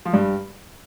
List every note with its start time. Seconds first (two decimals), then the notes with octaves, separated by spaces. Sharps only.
0.05 F3
0.13 G2 G3